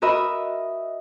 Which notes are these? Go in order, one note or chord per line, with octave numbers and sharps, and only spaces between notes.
F#4 A#4 D#5 E5 B5 D#6